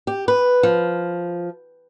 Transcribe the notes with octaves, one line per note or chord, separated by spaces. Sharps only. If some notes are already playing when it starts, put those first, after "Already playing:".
G4
B4
F3